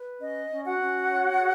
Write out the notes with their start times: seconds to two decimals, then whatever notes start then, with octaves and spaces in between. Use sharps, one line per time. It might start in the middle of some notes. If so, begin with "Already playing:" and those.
Already playing: B4
0.20 C#4 D#5
0.50 C#4
0.64 F#4 F#5
0.79 C#4
1.09 C#5
1.39 G#4